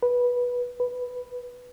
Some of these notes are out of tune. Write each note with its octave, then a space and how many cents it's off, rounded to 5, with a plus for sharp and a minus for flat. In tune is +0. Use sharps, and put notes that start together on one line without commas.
B4 -15
B4 +0